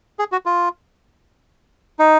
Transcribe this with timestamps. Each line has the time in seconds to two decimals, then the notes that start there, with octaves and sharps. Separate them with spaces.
0.19 G#4
0.32 F#4
0.46 F4
1.99 D#4